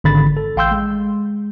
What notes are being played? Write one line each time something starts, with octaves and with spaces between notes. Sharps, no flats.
G#1 D3 B5 A6
A4
A1 F5 G5 C6 E6 G6
G#3